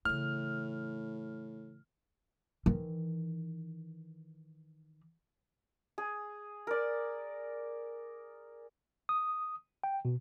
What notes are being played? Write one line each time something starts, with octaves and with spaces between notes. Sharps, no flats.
A2 C#3 E3 F6
D#3 E3
G#4
A#4 D5
D#6
G5
B2